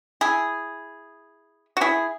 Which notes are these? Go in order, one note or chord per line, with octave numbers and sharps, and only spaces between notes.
E4 G#4
F#4
E4 G#4